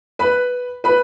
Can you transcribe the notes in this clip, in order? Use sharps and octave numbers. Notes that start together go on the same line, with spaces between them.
B4 B5
B4 B5